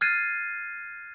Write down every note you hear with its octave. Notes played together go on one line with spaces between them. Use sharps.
F6 F#6 G#6 A6 C7 D#7